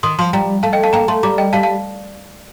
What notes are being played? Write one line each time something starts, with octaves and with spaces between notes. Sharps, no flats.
D#3 C6 D#6
F3 A5 C6
G3 G5 A#5
A3 F5 A5
D#5 G5
F5 A5
A#3 G5 A#5
A3 A5 C6
G3 A#5 D6
D#5 G5
G3 F5 A5
F5 A5